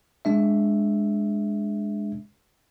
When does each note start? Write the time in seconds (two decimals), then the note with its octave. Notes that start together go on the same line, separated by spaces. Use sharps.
0.25 G#3 D4 E5